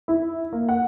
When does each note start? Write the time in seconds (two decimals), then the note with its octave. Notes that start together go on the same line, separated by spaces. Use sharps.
0.08 E4
0.53 A#3
0.68 F#5